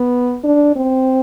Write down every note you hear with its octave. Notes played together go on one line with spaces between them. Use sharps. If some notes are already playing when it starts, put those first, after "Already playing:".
Already playing: B3
D4
C4